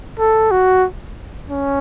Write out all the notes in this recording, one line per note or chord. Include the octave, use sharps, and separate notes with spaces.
A4
F#4
C#4